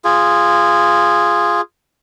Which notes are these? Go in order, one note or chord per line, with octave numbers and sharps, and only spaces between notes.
F4 G#4